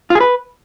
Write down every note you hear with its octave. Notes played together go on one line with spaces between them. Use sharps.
F4
G#4
B4